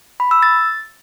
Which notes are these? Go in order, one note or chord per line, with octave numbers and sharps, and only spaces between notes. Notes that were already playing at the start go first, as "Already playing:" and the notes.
B5
E6
A6